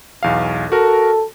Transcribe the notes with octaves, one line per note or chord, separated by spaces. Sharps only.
B1 E2 F5
F#4 A4 A#4